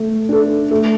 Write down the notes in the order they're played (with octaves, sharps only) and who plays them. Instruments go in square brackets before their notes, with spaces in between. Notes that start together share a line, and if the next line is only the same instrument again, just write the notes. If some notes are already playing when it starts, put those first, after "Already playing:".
Already playing: [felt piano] A3
D4 A4
A3